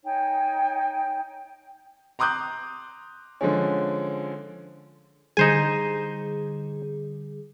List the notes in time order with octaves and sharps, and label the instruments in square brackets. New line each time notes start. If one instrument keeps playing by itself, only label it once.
[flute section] D#4 C#5 G5 G#5
[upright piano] A#5 C6 D6 D#6 F#6 G6
D3 F3 G#3 C#4
[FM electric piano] D3 G3 G#4 [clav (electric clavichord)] D#4 C5 G#5